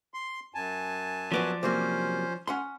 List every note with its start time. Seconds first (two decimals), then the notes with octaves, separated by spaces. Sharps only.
0.14 C6
0.54 F#2 G#5 A5
1.32 F3 F#3 B3 C#4 D5
1.63 C3 F#3 A#3 C#4 C5
2.47 C#4 F#5 C6